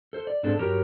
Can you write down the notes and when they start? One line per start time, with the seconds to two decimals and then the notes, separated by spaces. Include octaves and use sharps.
0.13 A4 C5
0.27 D5
0.43 G#2 C4 D4 G#4 A4
0.59 G2 F#3 G4 A#4 C#5 A#5